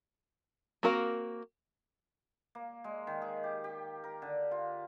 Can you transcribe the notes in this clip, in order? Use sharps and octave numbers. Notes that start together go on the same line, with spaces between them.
A#3 C4 F#4 A#4 F5
A#3
G#3
D#3
G#4
G4
G4
A#4
D3
F4